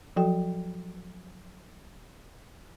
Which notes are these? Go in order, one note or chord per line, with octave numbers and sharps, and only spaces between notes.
F3 F#3 F#4 A4 G5